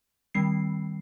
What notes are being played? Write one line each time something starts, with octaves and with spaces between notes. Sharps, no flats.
D#3 G3 C4 C7